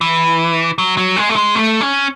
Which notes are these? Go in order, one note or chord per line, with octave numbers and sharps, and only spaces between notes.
E3
F#3
F#3
G#3
A3
G#3
A3
C#4